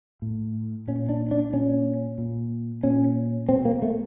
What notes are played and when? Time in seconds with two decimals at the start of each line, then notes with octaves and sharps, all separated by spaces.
0.22 A2
0.88 A#2 C#4
1.09 D4
1.31 D4
1.53 A#2 C#4
2.18 A#2
2.83 A#2 C#4
3.49 B2 C4
3.65 A#3
3.82 A3